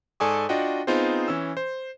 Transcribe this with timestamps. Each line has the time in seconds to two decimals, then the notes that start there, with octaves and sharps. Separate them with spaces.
0.20 G#2 A4 D5 G#5 C#6 D#6
0.49 D4 F4 F#4 D#5 F#5 G5
0.87 B3 C4 D#4 F4 G#4 C5
1.28 E3 C#4 E6
1.57 C5